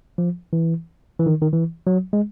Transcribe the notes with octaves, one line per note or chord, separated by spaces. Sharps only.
F3
E3
E3
D#3
D#3
E3
F#3
G#3